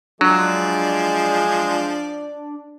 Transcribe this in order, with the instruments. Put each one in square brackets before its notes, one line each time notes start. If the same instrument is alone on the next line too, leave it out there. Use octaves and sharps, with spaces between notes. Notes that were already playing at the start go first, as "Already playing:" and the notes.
[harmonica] F3 D5 [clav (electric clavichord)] F#3 [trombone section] G#3 [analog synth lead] D4